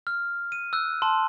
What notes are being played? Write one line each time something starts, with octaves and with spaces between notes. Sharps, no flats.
F6
D#7
E6 F#6
A5 C6